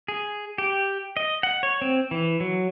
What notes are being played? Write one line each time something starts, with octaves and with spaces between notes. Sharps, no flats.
G#4
G4
D#5
F#5
C#5
C4
E3
F#3